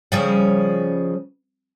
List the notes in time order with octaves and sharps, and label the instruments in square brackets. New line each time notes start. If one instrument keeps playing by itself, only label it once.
[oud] C#3 F3 G3